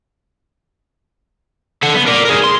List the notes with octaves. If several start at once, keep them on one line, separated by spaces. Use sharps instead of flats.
A4 F#5
B3
A#4 D5
G#4 A#4
C6